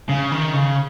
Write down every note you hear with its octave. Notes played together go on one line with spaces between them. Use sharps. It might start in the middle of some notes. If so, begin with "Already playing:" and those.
C#3
D#3
C#3